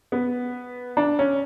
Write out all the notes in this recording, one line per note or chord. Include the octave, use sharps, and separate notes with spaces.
B3
D4
C#4